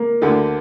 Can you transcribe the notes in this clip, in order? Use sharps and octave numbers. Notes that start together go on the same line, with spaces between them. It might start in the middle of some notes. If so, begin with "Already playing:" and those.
Already playing: A#3
D2 D3 A3